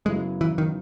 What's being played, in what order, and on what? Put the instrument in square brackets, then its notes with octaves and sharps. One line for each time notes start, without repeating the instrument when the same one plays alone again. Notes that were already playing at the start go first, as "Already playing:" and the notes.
[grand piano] F#2 C#3 F#3 B3 E4 [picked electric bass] G#3
[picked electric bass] E3
D#3